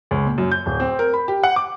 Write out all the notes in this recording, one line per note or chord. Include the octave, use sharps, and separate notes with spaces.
C#2
A#2
F#2
G6
D1
C4
A#4
B5
G4
F#5
D6